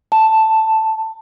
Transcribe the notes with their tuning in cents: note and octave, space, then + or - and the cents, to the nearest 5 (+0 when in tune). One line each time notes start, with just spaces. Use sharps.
A5 +5